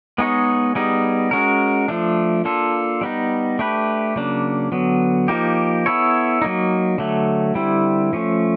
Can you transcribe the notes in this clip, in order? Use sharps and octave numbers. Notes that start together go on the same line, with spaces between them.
G#3 B3 D#4 G#4 C#5
G3 B3 D#4 G#4
G#3 C#4 F#4 A#4
F3 A3 D4
A#3 D4 F4 A4
G3 B3 D#4
A3 D4 G4 B4
C#3 F#3 A#3 D4
D3 F#3 B3
F3 A#3 D#4 G4
B3 E4 A4 C#5
F#3 A#3 D#4
D3 F#3 A3
D3 G3 C4 E4
F3 A3 C#4